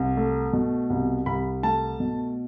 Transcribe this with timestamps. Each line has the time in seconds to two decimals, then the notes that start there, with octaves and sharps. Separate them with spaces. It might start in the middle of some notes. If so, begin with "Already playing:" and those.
Already playing: C2
0.17 A3
0.53 B2
0.90 C2
1.26 C2 B5
1.63 A3 A5
2.00 B2